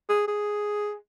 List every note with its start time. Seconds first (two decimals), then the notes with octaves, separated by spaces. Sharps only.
0.09 G#4
0.28 G#4